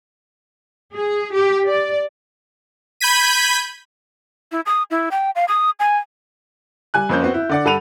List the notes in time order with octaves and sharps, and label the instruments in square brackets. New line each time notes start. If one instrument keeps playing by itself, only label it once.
[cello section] G#4
G4
D5
[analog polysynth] B5 G6 G#6 B6 D#7
[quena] E4
D#6
E4
G5
F5
D#6
G#5
[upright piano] G3 G#5 F#6
F2 A#3 C4 C#4 G6
B3 C4 F#4
E4
D3 D5 F#5
G2 A4 F#5 B5 D#7 F7